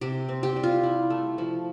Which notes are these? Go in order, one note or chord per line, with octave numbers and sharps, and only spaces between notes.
C3 G4
C4
G4
G3
F4
E4
A3
F3